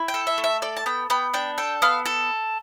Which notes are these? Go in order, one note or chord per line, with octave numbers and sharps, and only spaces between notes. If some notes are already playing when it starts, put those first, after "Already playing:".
Already playing: E4
G5
A4
E5
A3
E5
A4 D5
A5
B3 G5
B3 G5
D4 G5
A4 G5
B3 F5
A4